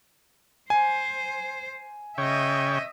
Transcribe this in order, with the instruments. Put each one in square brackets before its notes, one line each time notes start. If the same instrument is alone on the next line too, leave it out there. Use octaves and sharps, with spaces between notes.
[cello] C5 [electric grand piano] G#5
[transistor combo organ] C#3 C#5 G5 [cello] D#5 E5